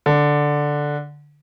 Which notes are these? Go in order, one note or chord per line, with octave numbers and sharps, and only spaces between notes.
D3